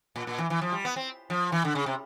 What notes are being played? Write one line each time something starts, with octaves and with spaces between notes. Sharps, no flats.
A#2
A#2
E3
E3
F3
G3
B3
C4
F3
E3
D3
C#3
C3